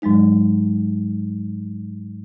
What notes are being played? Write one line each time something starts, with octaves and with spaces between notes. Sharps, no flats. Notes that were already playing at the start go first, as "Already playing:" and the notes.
G#2 F#3 G#3 D#4